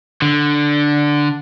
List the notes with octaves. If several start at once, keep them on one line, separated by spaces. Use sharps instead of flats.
D3